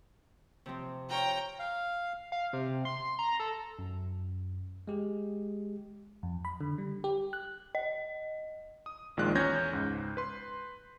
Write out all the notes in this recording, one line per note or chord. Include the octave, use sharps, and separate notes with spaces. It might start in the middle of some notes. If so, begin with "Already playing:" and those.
C3 F3 C4
F4 C#5 G5 A#5
F5
F5
C3
C6
A#5
A4
F#2
G#3 G4 G#4
F2
B5
D3
G3
G4
F#6
D#5
D#6
A#1 D#3 G#3 F4 D5 F#6
E2 C#4 C#5 G6 G#6 A#6
C#2 G#2
B4 C6